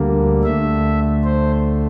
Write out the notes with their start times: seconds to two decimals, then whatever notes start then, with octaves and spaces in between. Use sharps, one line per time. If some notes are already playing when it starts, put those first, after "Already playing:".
Already playing: D2 D3 G3 A#3
0.44 D2 D3 A3 E5
1.24 C5